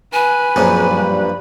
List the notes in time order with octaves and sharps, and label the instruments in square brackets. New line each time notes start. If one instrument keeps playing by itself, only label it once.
[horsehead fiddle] B4 [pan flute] G#5
[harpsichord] F#2 A#2 F3 [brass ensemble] C4 F4 G#4
[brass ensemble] G2